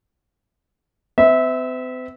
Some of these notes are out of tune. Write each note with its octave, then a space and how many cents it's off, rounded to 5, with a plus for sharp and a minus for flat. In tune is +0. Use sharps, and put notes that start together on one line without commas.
C4 -45 E5 -20